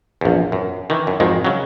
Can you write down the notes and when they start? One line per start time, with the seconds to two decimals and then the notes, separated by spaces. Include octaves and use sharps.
0.21 A#1 E2
0.52 F#2
0.90 D#3 E3
1.07 F#2
1.20 G#1 F2 D#3 G#3
1.45 C#3 F#3